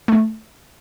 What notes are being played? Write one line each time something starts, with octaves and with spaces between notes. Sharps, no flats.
A3